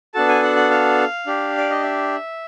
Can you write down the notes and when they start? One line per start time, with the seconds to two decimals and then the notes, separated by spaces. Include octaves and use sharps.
0.14 B3 D4 F#4 A4 A5
0.29 G#5
0.43 F#5
0.56 F#5
0.71 F5
1.27 D4 G4
1.57 D5
1.70 D#5
1.83 E5